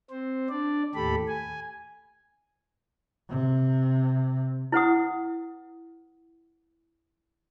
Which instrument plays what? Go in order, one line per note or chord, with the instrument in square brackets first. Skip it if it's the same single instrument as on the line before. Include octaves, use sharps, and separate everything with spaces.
[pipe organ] C4 C5
D4 D5
D#2 A2 G4 A4 B5
G#5
[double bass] C3
[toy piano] E4 B4 F#5 D#6